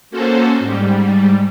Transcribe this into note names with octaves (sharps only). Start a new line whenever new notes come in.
A#3 C#4 F#4 A4 C5
G#2 G3